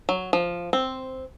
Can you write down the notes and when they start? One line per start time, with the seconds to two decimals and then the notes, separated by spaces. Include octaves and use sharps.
0.09 F#3
0.33 F3
0.73 C4